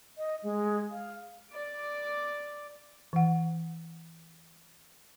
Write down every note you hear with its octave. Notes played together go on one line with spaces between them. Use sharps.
D#5
G#3
F5
D5 D6
E3 F#5